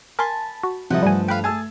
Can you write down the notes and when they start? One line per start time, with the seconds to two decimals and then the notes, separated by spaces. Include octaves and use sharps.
0.19 A#4 G#5 A5 B5 C6
0.63 F#4
0.90 C3 F3 G3 A4 D#5 E5 F#5
1.03 G2 G3 A3 G#5
1.28 B4 F5 G5 B5
1.44 A3 G#4 A5 E6 G#6